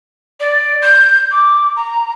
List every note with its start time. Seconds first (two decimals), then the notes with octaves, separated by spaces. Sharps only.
0.40 D5
0.82 G6
1.32 D6
1.76 A#5